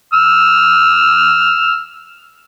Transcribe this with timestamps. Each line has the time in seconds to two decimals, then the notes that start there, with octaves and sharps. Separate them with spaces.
0.14 E6 F6